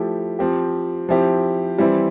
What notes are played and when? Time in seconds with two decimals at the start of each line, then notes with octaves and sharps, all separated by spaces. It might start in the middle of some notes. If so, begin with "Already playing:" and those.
Already playing: F3 A3 E4 G4
0.39 F3 C4 G4
1.09 F3 C4 E4 G4
1.78 E3 G3 C4 E4